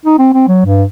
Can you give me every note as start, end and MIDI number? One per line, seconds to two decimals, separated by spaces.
0.06 0.17 63
0.19 0.29 60
0.34 0.47 60
0.48 0.64 54
0.65 0.84 43